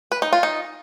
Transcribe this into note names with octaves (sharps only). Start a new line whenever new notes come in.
B4
D#4
F4
D#4